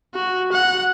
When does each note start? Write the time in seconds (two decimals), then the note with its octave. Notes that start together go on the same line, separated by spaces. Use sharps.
0.15 F#4
0.52 F#5